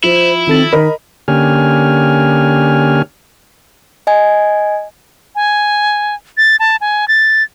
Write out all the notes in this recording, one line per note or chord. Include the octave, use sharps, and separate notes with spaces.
F3 E4 C5
D#3 C4 A4 A6
D#3 A#4 D#5 B5
D3 A#3 C#4 G4 G#5 F6
D#5 G#5 G#6
G#5
A6
A5
G#5
A6